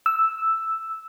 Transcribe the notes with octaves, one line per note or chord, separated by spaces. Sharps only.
E6